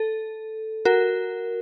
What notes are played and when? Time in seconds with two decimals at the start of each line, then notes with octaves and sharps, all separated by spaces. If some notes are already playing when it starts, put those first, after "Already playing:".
Already playing: A4
0.85 F#4 A#4